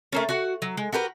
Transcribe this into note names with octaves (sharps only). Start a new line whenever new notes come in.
A3 A#3 C#4
F#4 F#5
F#3
G#3
F#4 G4 A#4 B4